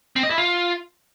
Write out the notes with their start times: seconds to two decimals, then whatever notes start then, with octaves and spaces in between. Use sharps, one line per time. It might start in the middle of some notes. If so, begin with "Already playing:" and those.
0.16 C4
0.23 D#5
0.31 E4
0.38 F4